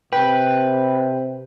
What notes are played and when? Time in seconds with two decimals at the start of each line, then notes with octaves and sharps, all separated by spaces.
0.13 C3 B4 G5